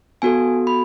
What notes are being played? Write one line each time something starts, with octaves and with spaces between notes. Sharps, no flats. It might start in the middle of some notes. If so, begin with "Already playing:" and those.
B3 F#4 A4 G#5
B5